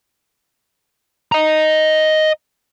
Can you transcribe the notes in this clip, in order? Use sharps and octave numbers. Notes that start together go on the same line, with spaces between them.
D#5 A#5